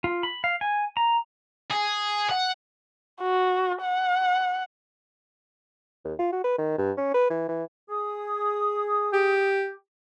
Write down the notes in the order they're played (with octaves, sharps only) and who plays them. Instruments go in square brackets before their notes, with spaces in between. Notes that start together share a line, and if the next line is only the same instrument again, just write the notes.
[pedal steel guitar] F4
B5
F5
G#5
A#5
[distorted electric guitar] G#4
F#5
[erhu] F#4
F#5
[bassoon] D#2
F4
F#4
B4
D#3
G2
C#4
B4
E3
E3
[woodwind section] G#4 D#6
[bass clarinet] G4